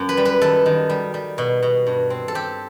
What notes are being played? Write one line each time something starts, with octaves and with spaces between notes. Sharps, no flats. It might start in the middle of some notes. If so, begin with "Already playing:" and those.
Already playing: F#2
B4
G3
B4
D#3 A4
D#3
G3
G3
B2
B2
G2
C4
A4
C4 G4